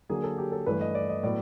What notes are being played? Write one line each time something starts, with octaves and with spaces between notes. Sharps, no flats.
D3 F#3 A#3 G#4
A4
G4
A4
G2 E3 A3 B4
D#5
D5
D#5
A2 F#3 B3 D5